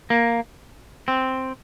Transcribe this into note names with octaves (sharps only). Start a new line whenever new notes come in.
A#3
C4